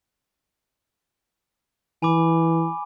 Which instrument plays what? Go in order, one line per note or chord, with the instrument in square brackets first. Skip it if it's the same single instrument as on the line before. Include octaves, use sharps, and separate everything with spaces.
[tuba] E3 [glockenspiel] G#5 B5 D6